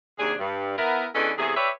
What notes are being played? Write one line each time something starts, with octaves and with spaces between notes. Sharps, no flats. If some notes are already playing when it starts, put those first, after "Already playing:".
D#2 C3 D4 G#4
G2
B3 E4 A#4
E2 C#4 D4 A4 B4 D#5
E2 C3 A3 G#4
G4 B4 C#5 D5 E5